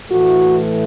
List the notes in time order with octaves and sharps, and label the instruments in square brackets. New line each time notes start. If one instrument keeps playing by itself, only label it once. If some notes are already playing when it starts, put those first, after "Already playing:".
[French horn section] A2 E3 A3 F#4